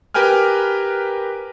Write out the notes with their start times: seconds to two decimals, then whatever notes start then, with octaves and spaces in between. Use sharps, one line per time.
0.14 G4 A#4 B4 G5 G#5 F6